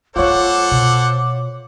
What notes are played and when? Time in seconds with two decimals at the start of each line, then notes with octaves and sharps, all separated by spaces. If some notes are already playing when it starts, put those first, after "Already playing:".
0.16 G3 A#3 F4 A4 C5 C#5 F#5 D6
0.71 B2